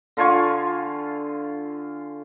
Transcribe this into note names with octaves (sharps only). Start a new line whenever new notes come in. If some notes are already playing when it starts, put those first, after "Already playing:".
D3 F4 G#5 C#6